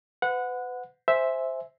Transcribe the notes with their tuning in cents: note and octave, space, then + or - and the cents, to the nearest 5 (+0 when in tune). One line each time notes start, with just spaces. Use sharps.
B4 +35 F#5 -15
C5 +0 E5 -5 G#5 +0